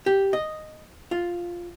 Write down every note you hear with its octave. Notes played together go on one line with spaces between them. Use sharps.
G4
D#5
F4